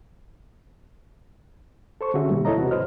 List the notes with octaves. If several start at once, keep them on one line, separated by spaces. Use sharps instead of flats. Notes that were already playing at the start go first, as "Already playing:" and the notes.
A4 C5 C#6
D3 C#4 F#4 G#4 E5
B2 D#3 G3 A#3
E2 E4 A4 C#5 D#5 A#5
C3 F#4 B4
E2 G#2 B4 C5 D#5 F6